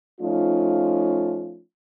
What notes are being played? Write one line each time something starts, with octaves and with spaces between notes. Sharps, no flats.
F3 A3 C#4 D#4 F4